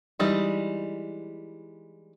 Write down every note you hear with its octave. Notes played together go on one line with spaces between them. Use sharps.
E3 G3 G#3 D#4